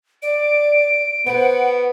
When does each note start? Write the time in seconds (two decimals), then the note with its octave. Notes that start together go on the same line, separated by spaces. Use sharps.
0.23 D5 D7
1.26 B3 B4 C5 F#5